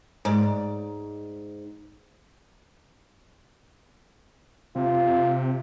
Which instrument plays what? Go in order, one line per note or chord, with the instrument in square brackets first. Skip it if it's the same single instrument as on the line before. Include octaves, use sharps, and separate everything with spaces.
[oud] G#2 D5
[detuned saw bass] C3 [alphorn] F4